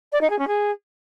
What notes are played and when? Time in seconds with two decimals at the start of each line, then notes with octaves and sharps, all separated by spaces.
0.12 D5
0.21 D#4
0.30 G#4
0.38 C#4
0.47 G#4